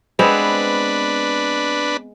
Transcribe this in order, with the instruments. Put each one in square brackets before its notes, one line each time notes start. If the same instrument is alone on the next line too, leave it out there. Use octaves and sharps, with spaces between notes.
[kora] G#3 B3 C4 [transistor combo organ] D4 B4